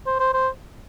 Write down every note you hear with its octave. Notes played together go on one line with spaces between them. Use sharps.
C5
C5
C5